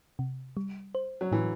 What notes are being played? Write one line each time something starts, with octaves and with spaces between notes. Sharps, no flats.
C3
G3
C5
F#3
A2 E3